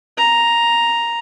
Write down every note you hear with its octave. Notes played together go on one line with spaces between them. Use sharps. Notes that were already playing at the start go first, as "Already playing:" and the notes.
A#5